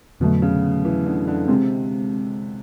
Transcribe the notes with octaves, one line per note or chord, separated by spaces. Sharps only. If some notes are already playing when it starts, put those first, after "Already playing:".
F2 B2 D3 F#3 A3
C#3
E3
D3
D3
C3 G#3 C4